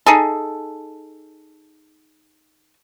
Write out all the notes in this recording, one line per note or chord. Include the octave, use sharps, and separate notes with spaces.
D#4 G#4 A4